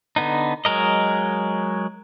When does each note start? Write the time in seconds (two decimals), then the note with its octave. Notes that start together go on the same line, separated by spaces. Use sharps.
0.16 D3 B3 D#4
0.65 F#3 G#3 A#4 D#5